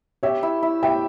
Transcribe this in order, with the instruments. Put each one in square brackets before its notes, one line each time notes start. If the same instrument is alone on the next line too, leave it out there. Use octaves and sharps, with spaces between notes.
[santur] G4 [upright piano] C#5 E5
[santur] E4
E4
[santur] G4 [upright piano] E5 G5